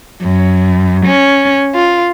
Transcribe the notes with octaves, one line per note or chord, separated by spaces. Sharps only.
F#2
C#4
F4